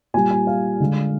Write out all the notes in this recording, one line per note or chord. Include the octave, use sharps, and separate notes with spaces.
A#2 G3 G#5
G#5
F5
D3 G#3